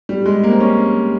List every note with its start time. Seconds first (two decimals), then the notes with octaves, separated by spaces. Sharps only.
0.09 G3
0.26 G#3
0.43 A#3
0.52 C4
0.60 C#4